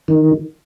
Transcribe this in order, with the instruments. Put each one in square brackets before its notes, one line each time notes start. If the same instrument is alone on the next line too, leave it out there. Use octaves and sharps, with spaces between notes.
[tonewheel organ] D#3